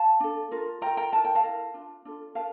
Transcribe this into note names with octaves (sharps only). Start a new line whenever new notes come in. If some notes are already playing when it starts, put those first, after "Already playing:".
Already playing: F5 A5
D4 A4
F4 A#4
F4 A#4 G5 A#5
G5 A#5
E4 A#4 A5
G5
F5 A5
E4 A#4
D4 F4
D4 F4 A4
A#4 F5 A5